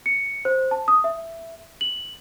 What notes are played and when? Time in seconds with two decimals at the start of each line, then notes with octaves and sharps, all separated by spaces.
0.06 C#7
0.45 C5
0.71 A5
0.88 D#6
1.04 E5
1.81 F#7